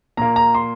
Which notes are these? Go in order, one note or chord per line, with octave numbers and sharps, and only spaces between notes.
A#2 A#3 A#5
A#5
C6